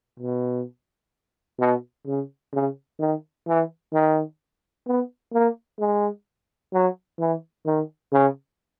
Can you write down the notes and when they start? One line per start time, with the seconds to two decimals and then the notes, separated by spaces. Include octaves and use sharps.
0.20 B2
1.60 B2
2.07 C#3
2.53 C#3
2.99 D#3
3.47 E3
3.93 D#3
4.87 B3
5.33 A#3
5.79 G#3
6.73 F#3
7.19 E3
7.66 D#3
8.13 C#3